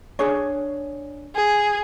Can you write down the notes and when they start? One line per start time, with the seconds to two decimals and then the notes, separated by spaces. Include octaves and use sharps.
0.19 D4 G#4 C#5
1.36 G#4